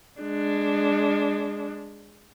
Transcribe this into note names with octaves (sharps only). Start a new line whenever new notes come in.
G#3 D4